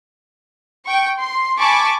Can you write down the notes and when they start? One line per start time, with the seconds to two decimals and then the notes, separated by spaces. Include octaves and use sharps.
0.86 G5 C#6
1.19 C6
1.58 G#5 A5 B5 C#6 D6